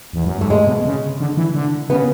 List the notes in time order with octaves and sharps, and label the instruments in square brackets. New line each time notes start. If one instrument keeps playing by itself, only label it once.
[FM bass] E2
F#2
[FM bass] G#2 [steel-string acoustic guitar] A3
[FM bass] A2 [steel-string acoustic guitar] G#3
[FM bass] B2
C#3
D3
E3
D3
[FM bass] C#3 [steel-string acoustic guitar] B3